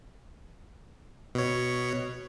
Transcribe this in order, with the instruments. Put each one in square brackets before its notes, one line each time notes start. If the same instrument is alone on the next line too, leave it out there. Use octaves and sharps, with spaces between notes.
[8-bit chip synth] B2 C#5